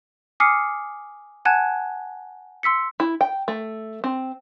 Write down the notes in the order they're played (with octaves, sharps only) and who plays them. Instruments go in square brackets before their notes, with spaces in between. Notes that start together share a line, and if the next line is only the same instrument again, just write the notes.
[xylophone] G#5 D6 D#6 F6 C7 C#7
F#5 G#5 A5 F#6 G#6 E7
C6 E6 B6 C#7
[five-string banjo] E4
G5
A3
C4